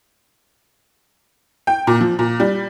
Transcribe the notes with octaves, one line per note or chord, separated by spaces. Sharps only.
G5
A#2
F3
A#2
G3